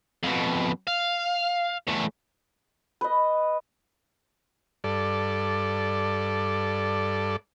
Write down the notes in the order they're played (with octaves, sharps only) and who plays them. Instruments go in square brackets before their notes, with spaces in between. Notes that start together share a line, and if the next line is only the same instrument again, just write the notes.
[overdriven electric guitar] F2 B2
F5
E2 A3
[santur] B4 D#5
[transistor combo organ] G2 A4 D5